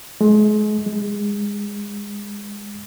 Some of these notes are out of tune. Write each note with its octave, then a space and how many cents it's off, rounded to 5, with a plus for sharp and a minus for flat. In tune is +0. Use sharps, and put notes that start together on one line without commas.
G#3 +35
G#3 -20